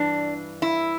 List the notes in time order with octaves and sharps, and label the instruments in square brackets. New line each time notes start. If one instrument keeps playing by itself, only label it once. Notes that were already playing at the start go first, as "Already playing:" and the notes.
Already playing: [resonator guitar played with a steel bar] G2 E3 D4
E4